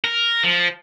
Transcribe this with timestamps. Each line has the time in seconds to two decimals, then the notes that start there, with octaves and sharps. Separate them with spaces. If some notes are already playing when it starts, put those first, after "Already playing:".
0.04 A#4
0.44 F3